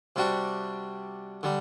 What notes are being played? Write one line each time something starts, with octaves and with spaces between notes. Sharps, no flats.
C3 G3 D4 F#4
D3 G3